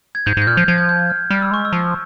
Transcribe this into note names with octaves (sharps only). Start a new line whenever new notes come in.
G#6
G#2 G6
G#2 G6
A#2 F6
F3 G6
F3 G#6
G6
G6
G6
F6
G3 F6
E6
G#3 C#6
E6
F3